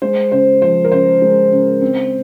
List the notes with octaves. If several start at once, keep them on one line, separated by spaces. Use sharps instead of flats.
G#3 C5
C#3 C5
F3 C5
A#4
C#3 C5
G#3
C#3
C4